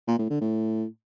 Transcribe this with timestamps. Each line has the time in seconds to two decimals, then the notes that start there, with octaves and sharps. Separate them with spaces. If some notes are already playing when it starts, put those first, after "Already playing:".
0.08 A#2
0.19 A2
0.30 D3
0.41 A2